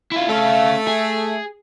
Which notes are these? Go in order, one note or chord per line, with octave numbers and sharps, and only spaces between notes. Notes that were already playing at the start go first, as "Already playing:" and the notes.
E4 F4
A3 C#4 F5
G#4